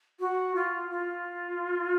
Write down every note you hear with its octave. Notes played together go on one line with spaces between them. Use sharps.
F#4
F4
F4